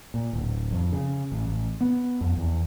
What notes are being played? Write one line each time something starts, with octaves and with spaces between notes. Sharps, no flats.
A#2
D1
F2
C#3
A1
A1
B3
F2
E2